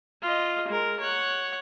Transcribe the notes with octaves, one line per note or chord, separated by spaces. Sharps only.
F4 D#5
G#3 A#4
C#5 F#5